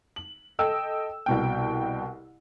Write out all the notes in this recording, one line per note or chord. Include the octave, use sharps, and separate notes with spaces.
F#7
A4 D#5 G5 E6
C2 B2 G5